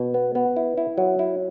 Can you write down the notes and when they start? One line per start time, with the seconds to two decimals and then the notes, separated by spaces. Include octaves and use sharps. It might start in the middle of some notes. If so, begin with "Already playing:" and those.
Already playing: B2
0.14 B3
0.35 B3
0.56 E4
0.77 E4
0.98 F#3
1.19 E4